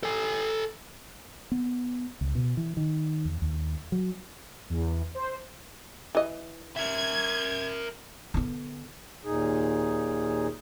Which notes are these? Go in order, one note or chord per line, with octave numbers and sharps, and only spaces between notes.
A4 G#5
B3
C#2
B2
E3
D#3
E2
D#2
F#3
E2
C5
E3 D#5
A#4 E5 G#6
D3 B3
D#2 A#2 D#4 G#4